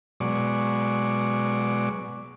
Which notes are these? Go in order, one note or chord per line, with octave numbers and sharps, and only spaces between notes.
B2 F#3 G#3 D5 C#6